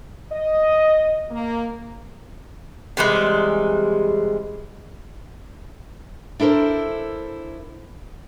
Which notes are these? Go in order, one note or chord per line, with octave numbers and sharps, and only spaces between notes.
D#5
A#3
C3 E3 G3 G#3
D4 E4 A4 A#4 C5